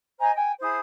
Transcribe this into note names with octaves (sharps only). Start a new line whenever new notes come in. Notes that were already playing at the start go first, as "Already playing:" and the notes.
C5 D#5 G#5 A#5
G5 G#5
E4 G#4 C5 D#6